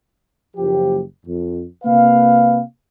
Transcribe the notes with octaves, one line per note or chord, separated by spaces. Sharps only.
F#1 F3 G4
F2
C3 A#3 B4 F5